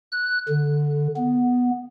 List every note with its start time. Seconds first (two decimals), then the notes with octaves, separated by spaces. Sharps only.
0.12 F#6
0.48 D3
1.16 B3